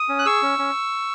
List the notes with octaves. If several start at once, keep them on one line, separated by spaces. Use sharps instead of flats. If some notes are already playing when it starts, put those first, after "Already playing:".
Already playing: D#6
C#4
F#6
G#4 C#6 E6
C#4
C#4